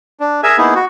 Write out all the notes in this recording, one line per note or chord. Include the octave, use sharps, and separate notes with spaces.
D4
G#4 A#4 E5 G#5
A#3 B3 D#4 E4 G#4
F#4